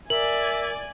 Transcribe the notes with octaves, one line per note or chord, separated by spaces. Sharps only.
A#4 D5 E5 G#5 F#7